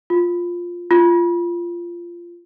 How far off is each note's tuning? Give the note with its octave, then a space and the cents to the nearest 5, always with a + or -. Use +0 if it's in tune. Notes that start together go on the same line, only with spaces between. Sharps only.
F4 +5
F4 -15